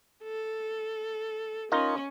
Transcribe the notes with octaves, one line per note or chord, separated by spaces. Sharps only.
A4
C#4 D#4 F4 A#4